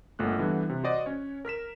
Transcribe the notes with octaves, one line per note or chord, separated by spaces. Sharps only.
G1 A#2 A3 F#6
D3 E3 G3 B3
C3
F#4 C5 D5 D#5
C#4 C#5
A#4 F6 B6 E7